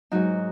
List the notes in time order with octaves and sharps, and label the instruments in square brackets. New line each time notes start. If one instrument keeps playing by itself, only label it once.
[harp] G#2 F#3 D#4 F#4